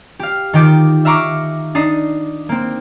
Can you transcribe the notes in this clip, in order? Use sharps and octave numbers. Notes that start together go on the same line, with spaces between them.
G4 F5
D#3 D#4 F4 G5 D6 G6
E5 F5 A#5 C#6 D6
D4 D#4 D#6 C7
A#3 C4